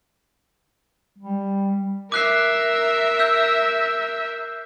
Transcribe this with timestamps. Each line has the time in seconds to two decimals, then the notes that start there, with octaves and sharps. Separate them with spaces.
1.18 G3
2.12 A#4 E5 D6 F#6 C7
3.19 E6 G6